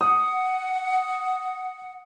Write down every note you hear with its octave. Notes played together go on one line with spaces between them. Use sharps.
F#5 D#6